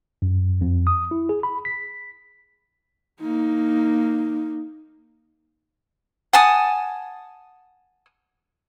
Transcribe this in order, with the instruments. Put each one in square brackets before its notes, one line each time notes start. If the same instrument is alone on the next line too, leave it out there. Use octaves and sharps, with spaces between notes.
[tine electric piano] F#2
F2
D#6
E4
G#4
B5
B6
[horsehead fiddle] A#3 D#4
[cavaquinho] F#5 G#5 A5 D#6